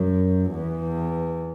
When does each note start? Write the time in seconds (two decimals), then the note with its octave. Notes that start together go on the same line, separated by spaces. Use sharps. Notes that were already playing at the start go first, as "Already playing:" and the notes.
Already playing: F#2
0.51 E2